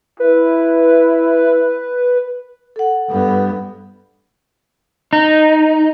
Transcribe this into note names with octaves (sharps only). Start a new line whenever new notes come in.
E4 B4
A4 F#5
G2 B3
D#4